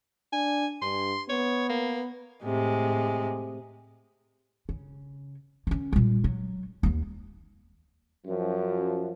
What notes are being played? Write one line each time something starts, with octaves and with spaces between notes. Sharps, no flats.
D4 G#5
G2 C6
B3 C#5
A#3
A2 C3 G#3
C#3
D3 C#4
A#2 G3
F#3
D#2 B3
F#2 F3